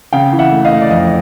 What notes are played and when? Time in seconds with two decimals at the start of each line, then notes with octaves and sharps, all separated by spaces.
0.13 C#3 F5 G5
0.33 E3
0.39 E5 F#5
0.52 A3
0.65 D#5 F5
0.71 A3
0.82 D5
0.91 F2 D#5